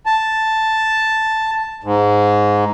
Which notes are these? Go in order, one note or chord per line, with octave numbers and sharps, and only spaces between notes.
A5
G#2